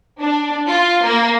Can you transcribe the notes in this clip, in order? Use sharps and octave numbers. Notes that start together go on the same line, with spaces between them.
D4
F4
A#3